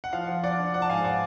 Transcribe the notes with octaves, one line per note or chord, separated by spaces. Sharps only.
F#5
F3 F5
F3
F3 D5 F#5
D4
F3 D5 F#5
A5
G#2 F5 G#5
D5 F#5